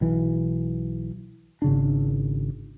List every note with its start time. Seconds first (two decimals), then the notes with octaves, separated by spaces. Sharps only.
0.01 B1 E3
1.62 G#1 C#3 D4